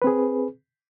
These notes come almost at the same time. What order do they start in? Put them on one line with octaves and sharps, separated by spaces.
B4 C4 G#4